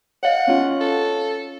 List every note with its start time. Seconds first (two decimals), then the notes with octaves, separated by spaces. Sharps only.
0.23 C#5 D#5 F5 F#5
0.47 C#4 F4
0.80 A4